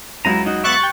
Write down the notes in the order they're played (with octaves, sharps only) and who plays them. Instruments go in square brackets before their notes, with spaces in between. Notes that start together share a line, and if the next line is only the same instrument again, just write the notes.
[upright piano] C#2 F#3 D#7 [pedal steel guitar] E4 A#5
[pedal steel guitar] D#4 F#4
[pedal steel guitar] B3 D5 E5 [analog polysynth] C#6 F#6 A6
[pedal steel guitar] G4 [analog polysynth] G5 C#6